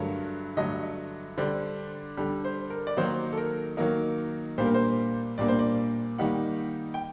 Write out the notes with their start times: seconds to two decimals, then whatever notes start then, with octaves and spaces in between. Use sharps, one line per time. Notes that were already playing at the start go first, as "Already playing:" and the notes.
Already playing: G2 D3 F#3 A3 A#4
0.57 G2 D3 F#3 A3 D#5
1.38 D3 G3 D4 C5
2.17 D3 G3 D4
2.45 C5
2.70 A#4
2.87 D5
2.97 D#3 F#3 A#3 D#4 C5
3.33 A4
3.38 A#4
3.77 D#3 F#3 A#3 D#4 A#4
4.58 A#2 G3 A#3 D4 C5
4.66 A#4
4.74 C5
5.38 A#2 G3 A#3 D4 D5
5.48 C5
5.59 D5
6.18 D#3 G3 A#3 D#4 F#5
6.94 G5